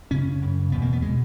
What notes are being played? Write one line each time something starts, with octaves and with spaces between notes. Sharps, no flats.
F#2 C#3 C#4
F#2 C#3
E2 B2 B3
A#3
B3
B2 G#3